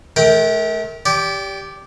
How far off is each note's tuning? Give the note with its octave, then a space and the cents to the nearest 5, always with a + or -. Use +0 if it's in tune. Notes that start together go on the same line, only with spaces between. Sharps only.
A3 -40 A#4 +0 G5 +0
G4 +0 D5 -30